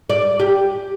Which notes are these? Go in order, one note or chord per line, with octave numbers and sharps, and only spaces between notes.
D5
G4